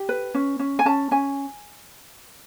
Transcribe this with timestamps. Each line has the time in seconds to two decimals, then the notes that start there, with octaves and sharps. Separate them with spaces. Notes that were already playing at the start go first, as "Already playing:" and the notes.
Already playing: G4
0.09 B4
0.34 C#4
0.59 C#4
0.79 G#5
0.85 C#4 A5
1.11 C#4 G#5